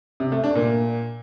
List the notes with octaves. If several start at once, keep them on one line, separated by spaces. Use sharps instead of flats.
C3
A3
D4
A#2